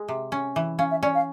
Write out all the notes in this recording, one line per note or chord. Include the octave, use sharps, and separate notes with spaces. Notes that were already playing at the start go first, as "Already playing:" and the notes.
Already playing: G#3
C3
C#4
E3
C#4 F5
E5
C#4 D5
F5